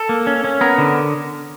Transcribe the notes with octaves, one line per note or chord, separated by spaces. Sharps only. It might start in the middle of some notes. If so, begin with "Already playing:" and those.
Already playing: A4
A#3
C#4
C#4
B3 A#4
D3